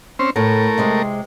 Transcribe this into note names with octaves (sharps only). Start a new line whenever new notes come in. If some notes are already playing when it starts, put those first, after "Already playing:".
C4 C#4 C5
A2 A3 A#4
C3 G#3 C4